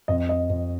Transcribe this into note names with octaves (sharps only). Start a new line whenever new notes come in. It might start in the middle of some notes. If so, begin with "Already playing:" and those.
F2 D#5
D#5
F2